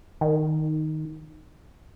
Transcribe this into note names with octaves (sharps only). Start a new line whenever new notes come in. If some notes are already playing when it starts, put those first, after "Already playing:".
D#3